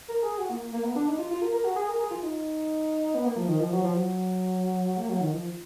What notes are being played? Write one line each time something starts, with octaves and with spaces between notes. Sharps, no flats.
A#4
G#4
F#4
A#3
A#3
B3
D4
D#4
F4
F4
A#4
A#4
F#4
G#4
A#4
G#4
F4
D#4
B3
A#3
F3
D#3
F3
F#3
F3
F#3
A#3
F#3
D#3
F3